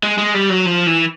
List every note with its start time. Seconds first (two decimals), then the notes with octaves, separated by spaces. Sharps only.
0.03 G#3
0.18 G#3
0.34 G3
0.50 F#3
0.66 F3
0.87 E3